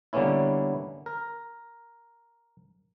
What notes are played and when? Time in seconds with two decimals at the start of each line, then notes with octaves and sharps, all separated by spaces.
0.13 D3 G3 A#3 B3 C#4 E4
1.06 A#4